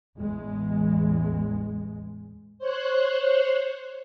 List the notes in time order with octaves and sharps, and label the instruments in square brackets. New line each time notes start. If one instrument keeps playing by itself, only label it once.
[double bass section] A1 E2 G#3
[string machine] C5 C#5 F#6